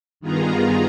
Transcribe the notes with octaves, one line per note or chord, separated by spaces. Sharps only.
G2 D#3 B3 F4 G#4 A#5